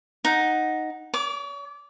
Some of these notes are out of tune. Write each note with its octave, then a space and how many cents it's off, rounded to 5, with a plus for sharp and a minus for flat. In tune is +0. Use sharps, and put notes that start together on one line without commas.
D#4 +0 F#5 +0
C#5 +40 D6 -15